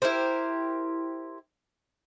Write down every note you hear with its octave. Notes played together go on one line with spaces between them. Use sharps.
E4 G4 A#4 C5